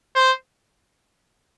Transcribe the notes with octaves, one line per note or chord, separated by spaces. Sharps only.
C5